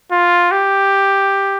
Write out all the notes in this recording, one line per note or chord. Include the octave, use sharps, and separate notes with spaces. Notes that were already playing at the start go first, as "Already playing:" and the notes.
F4
G4